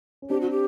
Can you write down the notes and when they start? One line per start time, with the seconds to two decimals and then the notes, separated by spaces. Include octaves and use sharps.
0.22 C#4
0.30 C4 D4 G4
0.41 F#4
0.51 G4